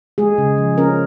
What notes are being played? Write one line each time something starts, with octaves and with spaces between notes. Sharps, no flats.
G#3 G#4
C#3
F3
C#4 A#4